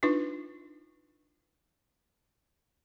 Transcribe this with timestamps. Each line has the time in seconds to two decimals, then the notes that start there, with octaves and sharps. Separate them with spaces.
0.03 D4 D#4 F4 B4